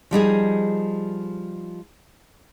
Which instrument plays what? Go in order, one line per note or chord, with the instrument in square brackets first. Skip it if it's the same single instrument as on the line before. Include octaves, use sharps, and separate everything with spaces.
[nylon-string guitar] F3 G3 D#4 G#4